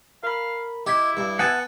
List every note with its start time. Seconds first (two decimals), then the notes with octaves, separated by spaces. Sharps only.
0.23 A#4 F5 B5
0.86 E4 G4 D#5 G#6 B6
1.17 G2 E6
1.39 B3 F#5 G#5 A5